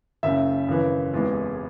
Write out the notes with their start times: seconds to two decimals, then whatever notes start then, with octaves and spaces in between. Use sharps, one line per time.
0.23 F#1 F#2 C#3 E5
0.68 G#1 F#2 C#3 E3
1.13 E1 E2 C3 E3 G#3